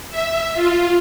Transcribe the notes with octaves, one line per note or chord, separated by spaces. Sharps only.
E5
F4